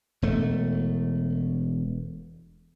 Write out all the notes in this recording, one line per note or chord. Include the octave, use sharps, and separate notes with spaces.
E1 A3